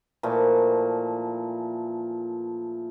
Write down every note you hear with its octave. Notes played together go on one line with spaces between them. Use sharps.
A#2 E3 F3 A3